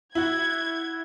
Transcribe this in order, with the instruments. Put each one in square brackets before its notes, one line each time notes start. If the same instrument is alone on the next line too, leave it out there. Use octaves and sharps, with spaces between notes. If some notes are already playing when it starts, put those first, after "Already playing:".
[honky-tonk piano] E4 F#4 [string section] G#6